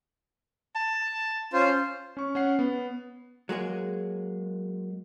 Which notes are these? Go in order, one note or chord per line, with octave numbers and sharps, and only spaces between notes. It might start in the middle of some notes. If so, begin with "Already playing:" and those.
A5
C#4 F4 C5
C#4 C#6
C#4 F#5 C7
B3
F#3 G#3 A#3 G#4